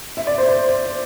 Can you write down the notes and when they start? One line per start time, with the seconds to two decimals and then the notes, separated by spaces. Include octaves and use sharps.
0.17 E5
0.27 D5
0.38 C5
0.49 C5